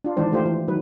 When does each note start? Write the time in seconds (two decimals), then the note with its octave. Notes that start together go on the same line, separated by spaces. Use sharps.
0.04 D4 F4
0.17 D#3 E3 G#3 D4 C5
0.32 D#3 A3 F4 G4 C5
0.45 E3
0.68 D#3 F#3 B4